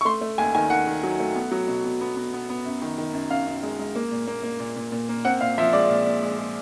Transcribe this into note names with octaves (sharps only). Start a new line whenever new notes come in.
C#6
A3 C6
A3
D#2 G#5
D#3 G#5
D#3 F#5
D#3
F#3
A3
B3
F#3
B2
B2
B3
B3
B3
B3
F#2
D#3
D#3
F#2
F#2 F5
F#2
G#3
G#3
A#3
A#2
A#3
A#3
A#2
A#2
A#2
A#3
C4 F#5
A#2 F5
F3 E5
G#3 D5
A#2
A#2
G#3
G#3